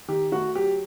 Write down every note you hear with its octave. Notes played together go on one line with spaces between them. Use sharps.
D#3 G4
A3 F#4
F#3 G4